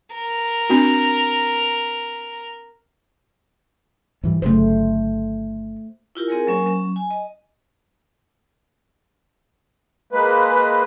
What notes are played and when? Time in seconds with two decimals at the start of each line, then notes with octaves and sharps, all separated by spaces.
0.13 A#4
0.70 C4 D4 F#4
4.23 G#2 E3 G3
4.42 G1 C#3 F#3 A3 C5
6.15 E4 F4 G4 A#4
6.28 C4 G#4 A#4 C#5 G#5
6.47 F#3 A#3 C#4 A#4 C5 G#5
6.66 F#3 C#4
6.96 G#5
7.11 D#5
10.12 G#3 A#3 B4